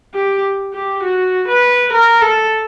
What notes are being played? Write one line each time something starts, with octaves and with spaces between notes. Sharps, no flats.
G4
G4
F#4
B4
A#4
A4